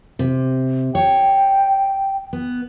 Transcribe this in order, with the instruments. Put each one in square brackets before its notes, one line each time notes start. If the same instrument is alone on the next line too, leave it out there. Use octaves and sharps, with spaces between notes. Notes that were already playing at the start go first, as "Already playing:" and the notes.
[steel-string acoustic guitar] C3
[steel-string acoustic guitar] C#5 [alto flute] G5
[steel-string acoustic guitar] B3